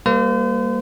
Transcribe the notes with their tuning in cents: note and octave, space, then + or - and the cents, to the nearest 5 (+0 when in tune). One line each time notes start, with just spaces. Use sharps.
G3 +20 A#3 -5 C5 -40